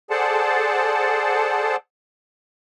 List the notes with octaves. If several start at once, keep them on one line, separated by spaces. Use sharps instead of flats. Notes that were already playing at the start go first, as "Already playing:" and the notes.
G#4 A4 C5 D5 F#5 A5